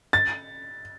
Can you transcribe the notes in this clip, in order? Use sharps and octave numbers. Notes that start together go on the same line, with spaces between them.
A6